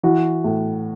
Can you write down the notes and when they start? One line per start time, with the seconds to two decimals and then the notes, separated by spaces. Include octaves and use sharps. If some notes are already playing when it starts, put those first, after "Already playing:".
0.03 E3 F#4
0.44 A2